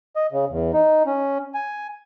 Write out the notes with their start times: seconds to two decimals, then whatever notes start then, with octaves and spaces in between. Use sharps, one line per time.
0.16 D#5
0.32 C#3
0.49 E2
0.74 D#4
1.07 C#4
1.55 G#5